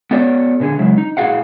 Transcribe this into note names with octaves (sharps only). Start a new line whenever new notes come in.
B3 F#4 A4 C#5 D5
A#2 D3 G4 G#4
C#3 F#3 G#3 E4
D#4
A#2 E4 F#4 G#4 F5 F#5